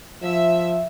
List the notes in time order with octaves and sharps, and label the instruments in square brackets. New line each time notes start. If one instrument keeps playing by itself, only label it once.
[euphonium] F3 [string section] E5